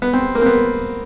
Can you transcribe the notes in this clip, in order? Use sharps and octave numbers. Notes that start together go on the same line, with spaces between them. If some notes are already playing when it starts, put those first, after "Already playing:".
B3
C4
A#3
C4
B3